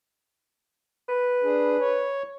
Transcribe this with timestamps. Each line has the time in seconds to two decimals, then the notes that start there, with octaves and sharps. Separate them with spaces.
1.09 B4
1.43 D4 G#4
1.80 C#5